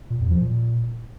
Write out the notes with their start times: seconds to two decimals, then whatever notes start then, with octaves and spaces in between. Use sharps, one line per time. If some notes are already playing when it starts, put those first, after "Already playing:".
0.10 A#2
0.20 E2
0.30 F3
0.41 A#2